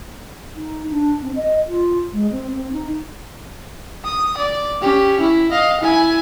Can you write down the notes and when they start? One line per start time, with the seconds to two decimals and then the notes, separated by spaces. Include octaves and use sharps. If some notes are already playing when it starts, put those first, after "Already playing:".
0.55 D#4
0.91 D4
1.22 C4
1.36 D#5
1.67 F4
2.13 G#3
2.32 C4
2.53 C4
2.73 D#4
4.04 D#6
4.37 D5
4.81 C#4 G4
5.20 E4
5.51 D#5 F5
5.81 E4 G#5